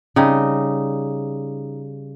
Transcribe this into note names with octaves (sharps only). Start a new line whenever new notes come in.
C#3 G3 D#4